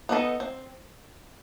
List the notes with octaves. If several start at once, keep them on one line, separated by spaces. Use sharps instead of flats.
B3 D#4 A4 D#5
C4